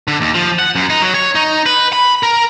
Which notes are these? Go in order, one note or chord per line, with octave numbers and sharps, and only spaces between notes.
D3
D#2
F3
F#5
F#2
D#4
F#3
C#5
D#4
B4
B5
A#4